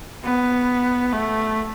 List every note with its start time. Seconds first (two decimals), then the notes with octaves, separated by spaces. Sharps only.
0.24 B3
1.12 A3